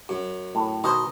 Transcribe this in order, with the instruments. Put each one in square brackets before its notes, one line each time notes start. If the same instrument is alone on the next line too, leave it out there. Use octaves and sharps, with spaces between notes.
[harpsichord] F#2
[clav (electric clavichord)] A2
[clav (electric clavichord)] B2 D#3 [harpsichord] C5 D#5